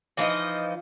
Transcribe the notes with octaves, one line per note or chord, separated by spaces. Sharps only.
E3 F3 D#4 D#5